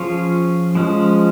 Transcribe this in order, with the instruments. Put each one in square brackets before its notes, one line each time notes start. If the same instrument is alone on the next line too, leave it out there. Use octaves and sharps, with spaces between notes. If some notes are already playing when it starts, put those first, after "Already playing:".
Already playing: [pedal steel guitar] F3 C#4 F4 G#4 C#5
F3 G#3 C#4